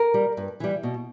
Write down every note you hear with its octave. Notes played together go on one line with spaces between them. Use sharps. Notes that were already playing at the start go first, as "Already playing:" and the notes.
Already playing: A#4
G3
G2
E3 G3
B2